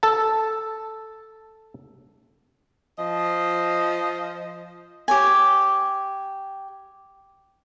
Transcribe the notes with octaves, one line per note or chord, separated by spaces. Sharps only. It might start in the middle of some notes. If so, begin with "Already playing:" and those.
A4 A5
F3 D#5
G4 C#5 G#5